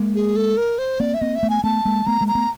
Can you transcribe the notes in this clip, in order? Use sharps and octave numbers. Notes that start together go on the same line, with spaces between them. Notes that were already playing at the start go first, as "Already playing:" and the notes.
Already playing: G#3 A#3
G#4
A4
A#4
C5
A#3 C4 D5
E5
A#3 C4 D#5
E5
A3 B3
G#5
A3 B3 A5
G#3 A#3
A3 B3 A#5
G#3 A#3
A#5
A3 B3